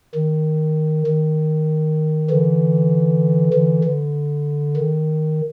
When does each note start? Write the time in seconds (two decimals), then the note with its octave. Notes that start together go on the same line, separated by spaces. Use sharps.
0.15 D#3
1.07 D#3
2.30 D3 E3
3.53 D3 E3
3.84 D3
4.77 D#3